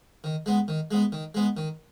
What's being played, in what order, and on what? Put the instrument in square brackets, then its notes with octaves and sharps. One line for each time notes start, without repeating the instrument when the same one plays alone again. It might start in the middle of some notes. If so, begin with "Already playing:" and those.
[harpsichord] D#3
G#3 B3
D#3
G#3 B3
D#3
G#3 B3
D#3